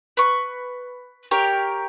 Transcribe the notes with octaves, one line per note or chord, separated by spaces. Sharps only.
B4 C#6
G4 A#4 C#5